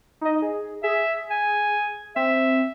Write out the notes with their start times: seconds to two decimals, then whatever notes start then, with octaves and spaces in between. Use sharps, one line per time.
0.21 D#4 D#5
0.42 G#4
0.83 G#4 E5
1.30 G#5
2.16 C4 E5